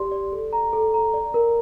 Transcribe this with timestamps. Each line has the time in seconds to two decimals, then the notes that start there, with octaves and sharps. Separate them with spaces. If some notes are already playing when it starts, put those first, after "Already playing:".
Already playing: G4 D5 C6
0.12 D5
0.32 A4
0.53 A#5
0.73 A4
0.94 A#5
1.14 D5
1.34 A#4